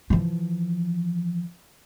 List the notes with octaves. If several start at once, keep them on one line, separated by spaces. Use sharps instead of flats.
E3 F3